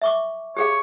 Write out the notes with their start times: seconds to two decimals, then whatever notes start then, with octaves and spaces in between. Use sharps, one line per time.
0.02 E5 C#6 D6
0.57 G4 G#4 C#5 F5